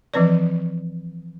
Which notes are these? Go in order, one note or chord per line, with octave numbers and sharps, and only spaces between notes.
E3 F3 C4 B4 D5